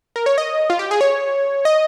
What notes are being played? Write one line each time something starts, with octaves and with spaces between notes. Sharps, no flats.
A#4
C#5
D#5
F4
G4
G#4
C#5
D#5